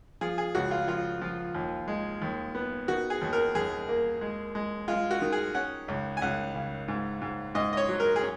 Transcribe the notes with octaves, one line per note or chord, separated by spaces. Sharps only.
F3 G#4
G#4
C#2 F#4
F4
F3 F4
F3
D#2
G#3
D#2
B3
D#3 F#4
G#4
D#2
A#4
D#2 G#4
A#3
G#3
G#3
G#3 F4
F#4
D#3
G#4
C#4 F#5
C#2
G#5
C#2 F#5
C#3
G#2
G#2
G#2 D#5
D#5
C#5
F#3
A#4
G#4
C#4